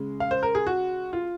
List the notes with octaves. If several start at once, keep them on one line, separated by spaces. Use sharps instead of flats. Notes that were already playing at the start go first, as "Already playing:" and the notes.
Already playing: C#3 G#3
F5
C5
A#4
G#4
F#4
F4